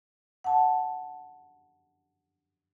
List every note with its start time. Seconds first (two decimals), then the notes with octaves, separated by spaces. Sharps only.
0.44 F#5 A5